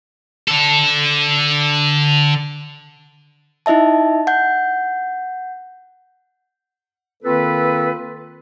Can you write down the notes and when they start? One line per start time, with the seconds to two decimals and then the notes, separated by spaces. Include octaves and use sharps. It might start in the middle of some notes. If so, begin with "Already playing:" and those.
0.48 D3 A4
3.66 D#4 E4 D#5 E5 A5
4.27 F#5 G6
7.23 D#3 A#3 C4 F4 A4 B4